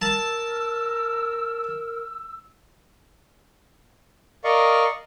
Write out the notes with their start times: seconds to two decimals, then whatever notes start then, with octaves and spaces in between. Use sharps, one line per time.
0.02 A#4 A5 E6
4.44 A#4 D5 D#5 F5 C#6